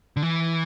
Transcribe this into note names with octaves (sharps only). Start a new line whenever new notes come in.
D3
E3